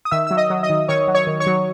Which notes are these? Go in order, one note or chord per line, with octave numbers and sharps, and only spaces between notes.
D#6
D#3 E5 E6
F#3 E6
D#5 D#6
F#3
D#5 D#6
D#3
D#3 C#5 C#6
F#3
C#5 C#6
D#3
C#5 C#6
F#3